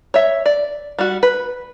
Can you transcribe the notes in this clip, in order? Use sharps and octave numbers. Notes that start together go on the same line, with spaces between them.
C#5 E5
D5
G3 F#4
B4